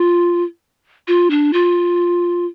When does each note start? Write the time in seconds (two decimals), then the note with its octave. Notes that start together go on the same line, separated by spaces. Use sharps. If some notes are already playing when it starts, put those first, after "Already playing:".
Already playing: F4
1.08 F4
1.30 D4
1.53 F4